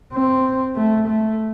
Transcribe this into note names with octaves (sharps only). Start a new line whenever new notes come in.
C4
A3
A3